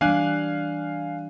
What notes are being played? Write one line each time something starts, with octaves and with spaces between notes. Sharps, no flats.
E3 G3 D4 F5 G#5 F#6